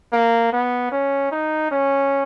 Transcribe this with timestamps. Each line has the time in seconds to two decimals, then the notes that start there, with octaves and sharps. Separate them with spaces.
0.13 A#3
0.53 B3
0.92 C#4
1.32 D#4
1.71 C#4